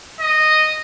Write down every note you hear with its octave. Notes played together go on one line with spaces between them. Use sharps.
D#5